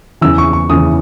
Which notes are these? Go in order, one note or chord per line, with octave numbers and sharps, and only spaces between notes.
E2 C#3 E3 E6
C#6
C#6
E2 C#3 E3 D#6